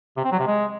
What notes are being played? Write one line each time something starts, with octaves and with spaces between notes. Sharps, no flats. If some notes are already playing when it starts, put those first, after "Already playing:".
C3
C4
F#3
C3
G#3